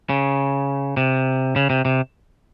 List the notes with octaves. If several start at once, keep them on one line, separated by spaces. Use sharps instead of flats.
C#3
C3
C#3
C3
C3